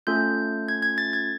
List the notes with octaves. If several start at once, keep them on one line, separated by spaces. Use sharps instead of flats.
A3 C#4 F4 A4 G6
G#6
G#6
A6
G#6